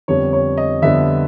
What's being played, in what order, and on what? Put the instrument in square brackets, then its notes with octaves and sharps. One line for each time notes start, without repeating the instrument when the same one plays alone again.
[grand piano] F2 D3 G3 B3 C#5
C#5
D#5
F2 D3 G3 B3 E5